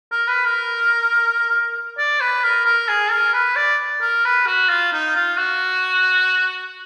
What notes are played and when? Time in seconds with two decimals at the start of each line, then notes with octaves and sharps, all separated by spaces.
0.11 A#4
0.27 B4
0.45 A#4
1.98 D5
2.20 B4
2.43 A#4
2.66 A#4
2.88 G#4
3.11 A#4
3.33 B4
3.56 D5
4.01 A#4
4.25 B4
4.46 F#4
4.69 F4
4.93 D#4
5.15 F4
5.37 F#4